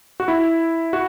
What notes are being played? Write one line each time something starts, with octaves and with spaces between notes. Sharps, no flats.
F#4
E4
F#4